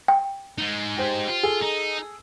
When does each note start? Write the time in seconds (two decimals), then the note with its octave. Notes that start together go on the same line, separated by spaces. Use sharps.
0.08 G5
0.58 G#3 D#4
0.97 G4 C5
1.28 F4
1.43 G#4 A4
1.61 D#4